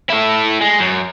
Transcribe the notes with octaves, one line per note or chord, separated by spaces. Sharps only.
E4 A4
G#3
F#2